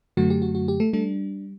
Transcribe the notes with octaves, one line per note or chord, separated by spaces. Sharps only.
F#2 D3 F#3 A3 F#4
G4
F#4
F#4
G4
A3 A4
G3 A3 D4 A4